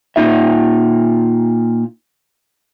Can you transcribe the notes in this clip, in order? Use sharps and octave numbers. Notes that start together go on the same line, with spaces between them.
A#2 D#4 F4 E5